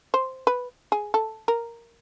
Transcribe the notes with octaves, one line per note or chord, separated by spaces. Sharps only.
C5
B4
G#4
A4
A#4